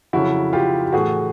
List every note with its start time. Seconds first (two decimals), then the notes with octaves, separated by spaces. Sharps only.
0.13 F2 C#3 F#3 E4 F#4
0.53 F4 G4
0.86 G4
0.93 A2 E3 F#4 G#4